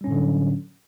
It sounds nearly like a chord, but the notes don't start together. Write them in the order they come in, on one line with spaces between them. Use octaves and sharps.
G3 C#4 A2 D3 F#3